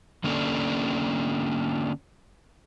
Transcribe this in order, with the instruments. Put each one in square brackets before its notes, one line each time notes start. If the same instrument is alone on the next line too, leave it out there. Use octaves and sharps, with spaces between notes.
[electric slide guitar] D3 A#3 C#4 D4 A4